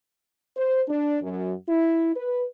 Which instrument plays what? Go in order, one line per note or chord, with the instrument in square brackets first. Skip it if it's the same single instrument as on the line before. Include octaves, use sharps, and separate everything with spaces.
[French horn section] C5
D4
F#2
E4
B4